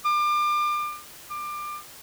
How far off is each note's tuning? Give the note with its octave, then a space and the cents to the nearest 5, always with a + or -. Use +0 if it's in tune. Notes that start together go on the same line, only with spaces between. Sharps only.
D6 +35
D6 +25